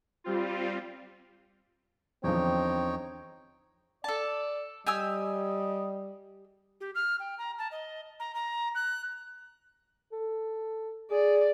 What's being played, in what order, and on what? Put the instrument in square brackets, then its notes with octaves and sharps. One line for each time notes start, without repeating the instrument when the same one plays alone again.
[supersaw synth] G3 C4 F4
[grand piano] E2 D3 F3 [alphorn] C4 [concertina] D#4 C#5 G5
[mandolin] A4 A5 [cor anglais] D5
[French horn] G3 [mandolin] G4 G#5 E6 [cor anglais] D#5
[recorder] G4
F6
G5
A#5
A5
D#5
A#5
A#5
F#6
[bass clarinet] A4
[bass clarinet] G#4 [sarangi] D5